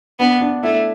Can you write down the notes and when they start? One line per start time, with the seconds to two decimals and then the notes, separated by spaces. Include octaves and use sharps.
0.19 B3 D4
0.41 D4
0.63 A3 E4